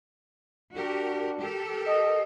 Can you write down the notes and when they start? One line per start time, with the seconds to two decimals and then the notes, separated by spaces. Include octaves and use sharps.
0.74 D4 F#4 G4 A#4
1.38 G4 A4 A#4
1.87 D#5